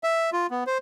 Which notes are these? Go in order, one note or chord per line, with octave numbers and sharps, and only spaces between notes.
E5
F4
B3
C5